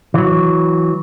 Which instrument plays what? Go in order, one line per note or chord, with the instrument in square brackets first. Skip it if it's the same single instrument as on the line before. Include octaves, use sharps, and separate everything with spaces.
[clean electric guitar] E3 F#3